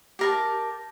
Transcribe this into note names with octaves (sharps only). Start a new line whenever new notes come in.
G4 A#4 A5